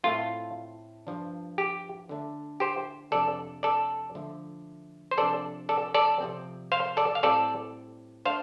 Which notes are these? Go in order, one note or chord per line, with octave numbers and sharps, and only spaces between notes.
A2 A3 C4 F4
G2 F3 D4
G4
D3 A3 D4
G4 C5
F2 C3 F3 D4 A4 D5
A4 D5
D3 F3 A3
C5
C3 F3 D4 A4 D5
A4 D5
A4 D5
C3 F3 C4
C5 F5
A4 D5
F5
A2 G3 C4 A4 D5
A3 D4 C5 F5